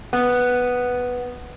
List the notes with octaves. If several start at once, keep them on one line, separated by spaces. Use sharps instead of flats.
B3